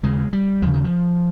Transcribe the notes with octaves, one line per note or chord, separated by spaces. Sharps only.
D#2 C#3 G#3
G3
D#2 C#3 F3
D#3
F3